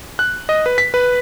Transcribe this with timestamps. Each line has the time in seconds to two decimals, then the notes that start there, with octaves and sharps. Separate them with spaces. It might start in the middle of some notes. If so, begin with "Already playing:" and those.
0.19 F#6
0.49 D#5
0.66 B4
0.78 B6
0.94 B4